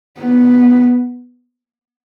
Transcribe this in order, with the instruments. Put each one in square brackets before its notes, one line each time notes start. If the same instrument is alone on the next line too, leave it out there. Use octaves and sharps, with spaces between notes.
[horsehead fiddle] B3